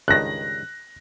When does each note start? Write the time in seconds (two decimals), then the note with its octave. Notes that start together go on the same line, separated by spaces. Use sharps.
0.08 C#2 G2 D#3 F#6 A#6